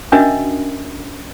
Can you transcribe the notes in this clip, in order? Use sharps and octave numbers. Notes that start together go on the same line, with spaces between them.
C#4 D4 F#4 A#4 D#5 E5